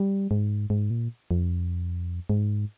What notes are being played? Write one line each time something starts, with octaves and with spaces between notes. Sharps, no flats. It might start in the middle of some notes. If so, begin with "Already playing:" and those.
Already playing: G3
G#2
G#2
A#2
F2
G#2